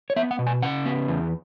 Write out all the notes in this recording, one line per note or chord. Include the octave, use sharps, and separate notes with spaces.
C#5
B3 E5
F#5
B2
G#5
C#3 F#5
B3
E2